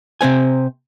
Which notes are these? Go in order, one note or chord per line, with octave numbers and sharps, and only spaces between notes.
C3 C4 C5 G#5